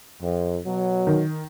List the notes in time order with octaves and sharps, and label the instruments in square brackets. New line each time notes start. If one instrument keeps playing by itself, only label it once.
[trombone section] F2
B2 F#3
[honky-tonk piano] D#3